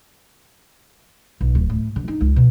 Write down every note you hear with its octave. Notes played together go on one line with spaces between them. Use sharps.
B1
D1
A2
D3
D#4
C#2
B2